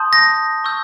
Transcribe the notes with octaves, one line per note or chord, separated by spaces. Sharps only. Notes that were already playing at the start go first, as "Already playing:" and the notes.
Already playing: A5 C6 D#6 G6
A#6
C#6 E6 G6